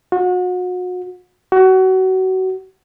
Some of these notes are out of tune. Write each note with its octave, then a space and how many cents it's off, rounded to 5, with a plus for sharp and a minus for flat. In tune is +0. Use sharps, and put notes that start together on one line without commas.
F#4 -35
F#4 +25